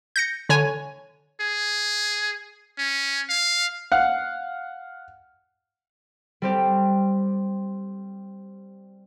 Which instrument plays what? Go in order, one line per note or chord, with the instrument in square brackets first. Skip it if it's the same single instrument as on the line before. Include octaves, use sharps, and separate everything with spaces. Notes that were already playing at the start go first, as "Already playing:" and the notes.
[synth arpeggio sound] G6 A#6 C#7
D3 C#5 G#5
[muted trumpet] G#4
C#4
F5
[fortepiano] F5 F#5
[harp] G3 C4 G4